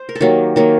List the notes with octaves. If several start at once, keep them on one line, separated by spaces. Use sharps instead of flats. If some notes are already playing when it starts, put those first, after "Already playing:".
Already playing: C5
A#4
A4
D#3 F#3 A#3 G4
D#3 F#3 A#3